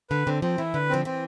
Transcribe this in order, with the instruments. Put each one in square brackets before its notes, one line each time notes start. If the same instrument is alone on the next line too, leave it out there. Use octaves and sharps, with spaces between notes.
[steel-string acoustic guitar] D3 [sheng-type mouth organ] B4
[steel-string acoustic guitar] D3 [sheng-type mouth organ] C4
[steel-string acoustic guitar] F3 [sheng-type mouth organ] C4
[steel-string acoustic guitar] E3 [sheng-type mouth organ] E4
[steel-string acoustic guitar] D3 [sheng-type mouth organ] B4
[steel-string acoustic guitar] F3 [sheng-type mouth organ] C4
[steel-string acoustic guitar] E3 [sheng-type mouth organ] C4